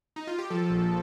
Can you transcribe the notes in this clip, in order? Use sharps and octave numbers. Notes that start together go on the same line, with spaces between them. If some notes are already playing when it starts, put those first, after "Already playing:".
D#4
F4
G4
F3 A4
A#1